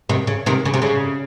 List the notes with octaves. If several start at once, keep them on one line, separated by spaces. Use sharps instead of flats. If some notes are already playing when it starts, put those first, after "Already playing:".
C3 D#3
C#3
C3 D#3
C#3
C3
C#3